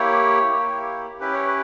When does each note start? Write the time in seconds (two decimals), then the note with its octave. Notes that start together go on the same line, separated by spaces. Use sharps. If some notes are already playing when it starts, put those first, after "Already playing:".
Already playing: A#3 E4 G4 C#5
0.52 A#3 E4 G4
1.20 C#4 E4 G4 B4
1.33 C#5
1.47 B4